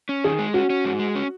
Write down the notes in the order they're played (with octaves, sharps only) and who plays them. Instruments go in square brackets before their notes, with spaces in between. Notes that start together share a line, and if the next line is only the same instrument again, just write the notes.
[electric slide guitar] C#4
[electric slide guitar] D#3 [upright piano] G#4
[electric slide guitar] G#3
[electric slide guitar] C#4 [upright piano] F#4
[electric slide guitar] C#4
G#2
G#3
C#4